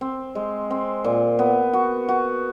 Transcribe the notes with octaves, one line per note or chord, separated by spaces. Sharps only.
C4
G#3
C4
A#2
B3
F#4
F#4